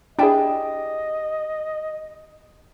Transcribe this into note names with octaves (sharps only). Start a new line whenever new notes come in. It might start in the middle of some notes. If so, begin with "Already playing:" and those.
D4 E4 G4 G#4 D#5 G5 A5